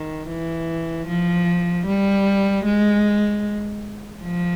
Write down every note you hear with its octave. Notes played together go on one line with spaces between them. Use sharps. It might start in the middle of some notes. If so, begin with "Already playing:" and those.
Already playing: D#3
E3
F3
G3
G#3
F3